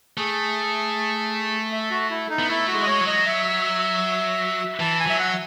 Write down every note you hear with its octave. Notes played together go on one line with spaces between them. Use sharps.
A3 G#4
E5
F#4
E4
D#4
B3
A3 E4
F#4
G#3
D#5
C#5
F#3
D#5
E5
E3 A5
G#5
F#3 E5
F#5